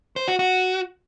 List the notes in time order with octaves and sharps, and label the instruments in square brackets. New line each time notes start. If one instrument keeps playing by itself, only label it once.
[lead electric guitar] C5
F#4
F#4